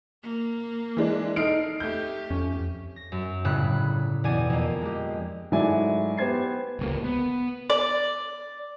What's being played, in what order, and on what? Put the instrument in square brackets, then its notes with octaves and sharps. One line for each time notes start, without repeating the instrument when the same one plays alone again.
[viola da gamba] A#3
[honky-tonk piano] E3 G#3 D4
[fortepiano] D#4 A4 [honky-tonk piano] F6 C7 D7
[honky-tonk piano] A3 G6 [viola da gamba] G4
[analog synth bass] F2 [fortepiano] C#4
[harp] A#6
F#2
G1 A2 C#3 B5 F#6
E2 B2 G4 D5 G#5 D#7
F2 A#3
G#3 G4
[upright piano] G#2 F#3 A3 E4 D5 G#5
B3 G4 C5 G#6 C7
[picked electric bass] D1 C#2 A#3
B3
[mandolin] D5